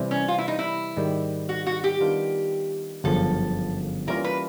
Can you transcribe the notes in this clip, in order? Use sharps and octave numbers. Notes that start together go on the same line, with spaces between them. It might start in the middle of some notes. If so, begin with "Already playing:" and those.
Already playing: C3 E3 G3 C4
C#4
F4
E4
D#4
E4
G#2 D#3 G3
F#4
F#4
G4
D#3 G3 B3 D4 F4
G1 F#2 C#3 F3 A4
E3 G3 A#3 C#4 F4 A#4
B4